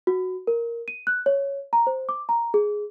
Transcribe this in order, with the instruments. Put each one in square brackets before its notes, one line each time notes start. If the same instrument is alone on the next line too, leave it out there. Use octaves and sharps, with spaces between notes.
[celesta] F#4
A#4
D#7
F#6
C#5
A#5
C5
D6
A#5
G#4